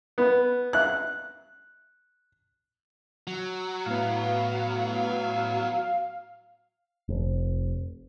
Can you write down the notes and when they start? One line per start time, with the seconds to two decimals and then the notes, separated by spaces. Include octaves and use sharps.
0.18 B3
0.73 F#6
3.27 F#3
3.86 A2 B3 F5
7.08 F1